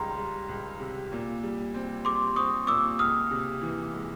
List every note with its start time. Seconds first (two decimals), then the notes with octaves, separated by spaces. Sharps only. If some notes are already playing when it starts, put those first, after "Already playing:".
Already playing: C#2 D#3 G3 A#5 C6
0.18 G3
0.48 C#2
0.80 C3
1.12 A#2
1.43 G3
1.74 C4
2.05 G3 C6 D6
2.36 C4 C#6 D#6
2.67 A#2 D6 E6
2.99 C#2 D#6 F6
3.31 C3
3.62 E3
3.93 G#3